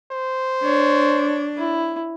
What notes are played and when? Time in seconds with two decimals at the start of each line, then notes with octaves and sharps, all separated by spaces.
0.11 C5
0.64 D4 C#5
1.57 E4